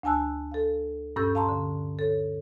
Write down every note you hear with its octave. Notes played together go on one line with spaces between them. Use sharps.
D2 D4 G#5 A5 E6 F#6
A4 F5
G2 A#2 C#4 A4 E6 G6
F5 A5 A#5 C6
D3
A4 C#5